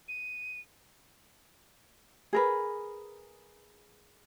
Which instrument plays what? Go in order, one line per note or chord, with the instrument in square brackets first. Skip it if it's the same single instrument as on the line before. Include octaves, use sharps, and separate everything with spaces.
[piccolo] D#7
[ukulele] G#4 A#4 B4